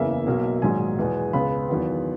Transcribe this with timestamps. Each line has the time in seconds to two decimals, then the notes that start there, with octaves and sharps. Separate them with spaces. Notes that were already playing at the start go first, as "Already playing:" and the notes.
Already playing: F#1 E2 C#3 E3 A#3 E5
0.27 B1 B2 F#3 A#3
0.62 A#1 G#2 D#3 F#3 G#5
0.98 E2 B2 G#3 B3
1.33 C#2 C#3 G#3 B3 B5
1.69 E2 D#3 F#3 B3